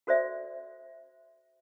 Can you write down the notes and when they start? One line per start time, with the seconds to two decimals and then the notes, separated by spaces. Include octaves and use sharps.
0.07 F#4 A4 C5 D5 E5